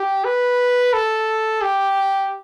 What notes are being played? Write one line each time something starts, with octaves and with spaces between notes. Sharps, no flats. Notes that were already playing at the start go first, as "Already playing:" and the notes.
Already playing: G4
B4
A4
G4